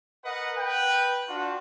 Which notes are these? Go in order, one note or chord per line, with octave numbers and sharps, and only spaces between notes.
A#4 B4 D#5 F#5
B4 G5
D4 F4 F#4 F#5